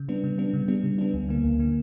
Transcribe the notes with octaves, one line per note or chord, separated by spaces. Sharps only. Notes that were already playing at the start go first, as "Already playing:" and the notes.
Already playing: C#3
G3 B3 D4
C#3
G3 B3 D4
C#3
G3 B3 D4
C#3
G3 B3 D4
D2
D3 A#3
D2
D3 A#3